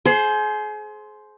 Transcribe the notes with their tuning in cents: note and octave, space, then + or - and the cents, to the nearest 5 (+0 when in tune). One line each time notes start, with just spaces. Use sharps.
G#4 +35 C5 +0